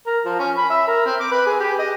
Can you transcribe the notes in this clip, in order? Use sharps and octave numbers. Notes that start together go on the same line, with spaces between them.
A#4
F3
C#4
B5
E5
A#4
C4
D6
B4
G#4
G4
D#5